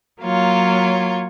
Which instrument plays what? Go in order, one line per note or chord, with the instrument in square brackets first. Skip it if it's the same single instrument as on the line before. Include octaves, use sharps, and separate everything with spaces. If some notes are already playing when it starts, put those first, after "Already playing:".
[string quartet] F#3 A#3 F4 C#5